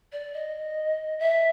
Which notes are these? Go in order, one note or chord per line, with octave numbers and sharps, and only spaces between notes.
D5
D#5
E5